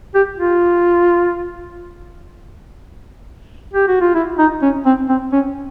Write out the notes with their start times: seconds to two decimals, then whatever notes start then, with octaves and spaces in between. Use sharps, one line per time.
0.15 G4
0.38 F4
3.74 G4
3.88 F#4
4.01 F4
4.15 E4
4.39 D#4
4.62 C#4
4.86 C4
5.09 C4
5.33 C#4